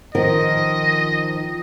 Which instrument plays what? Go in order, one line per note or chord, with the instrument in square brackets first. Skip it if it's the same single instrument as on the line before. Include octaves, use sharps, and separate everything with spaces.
[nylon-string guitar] D#3 F3 A#4 [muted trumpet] D#5